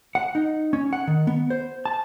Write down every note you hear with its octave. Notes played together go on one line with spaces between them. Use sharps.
F#5
D#4
C#4
F#5
D#3
B3
C5
A5